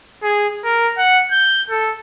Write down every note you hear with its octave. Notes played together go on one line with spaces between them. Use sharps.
G#4
A#4
F#5
G6
A4